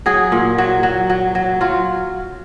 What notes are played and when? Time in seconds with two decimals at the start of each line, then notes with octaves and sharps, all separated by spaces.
0.06 F#3 G#4
0.32 A#2
0.58 F#3
0.83 F#3
1.10 F#3
1.35 F#3
1.61 F#3 F4